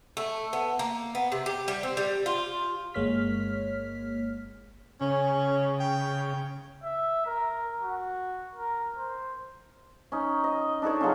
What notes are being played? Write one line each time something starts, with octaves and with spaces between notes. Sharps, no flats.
A3
B3
A#3
B3
C3
G4
G3
C4
G3
F4
G1 G#3 A#3 C#5 F6 B6
C#3 C#4
G5
E5
A#4
F#4
A#4
C5
C#4 D#4
D#5
D4 D#4 A4 C#5
C#3 F3 F#3 C#4